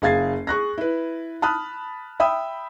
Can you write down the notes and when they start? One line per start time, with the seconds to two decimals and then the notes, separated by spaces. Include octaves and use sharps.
0.02 F#1 G#4 F5 G#6 A6 C7
0.47 G#4 C#6 F#6 A#6
0.78 E4 B4
1.42 A5 B5 D#6 F6 F#6
2.20 E5 G5 B5 D#6 E6